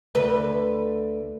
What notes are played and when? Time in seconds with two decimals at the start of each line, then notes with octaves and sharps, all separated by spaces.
0.15 D2 B4